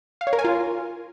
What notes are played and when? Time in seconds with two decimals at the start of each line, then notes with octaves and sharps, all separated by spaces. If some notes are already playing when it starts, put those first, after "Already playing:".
0.21 F5
0.27 C#5
0.33 A#4
0.39 G#5
0.45 F4